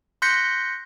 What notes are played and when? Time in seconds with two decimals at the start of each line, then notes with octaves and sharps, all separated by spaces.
0.22 C6 F#6 G6 A#6 B6 C#7